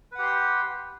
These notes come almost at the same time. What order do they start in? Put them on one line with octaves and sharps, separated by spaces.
B4 F#5 G4 C6 G5